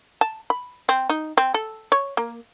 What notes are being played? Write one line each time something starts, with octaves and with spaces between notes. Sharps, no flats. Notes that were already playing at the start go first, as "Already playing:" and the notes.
A5
B5
C4
D#4
C4
A4
C#5
A#3